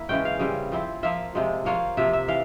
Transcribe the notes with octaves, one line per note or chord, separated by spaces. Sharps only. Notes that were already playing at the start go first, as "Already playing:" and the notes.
Already playing: A#3 E4
C#3 E3 G#3 C#4 G5
F5
C#3 G3 C4
F3 C4 E4
F3 A#3 F4 E5
C3 F3 G#3
F3 A#3 F4 C#5
C3 F3 A#3 E5
E5
E3 F5